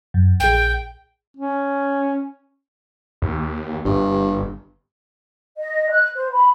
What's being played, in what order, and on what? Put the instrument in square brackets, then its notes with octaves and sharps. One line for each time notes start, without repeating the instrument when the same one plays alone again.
[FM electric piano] F#2
[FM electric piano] A#1 G#4 [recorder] G5
[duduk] C#4
[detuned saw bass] D#2
[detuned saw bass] G1 [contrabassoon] G2
[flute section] D#5
F#6
C5
B5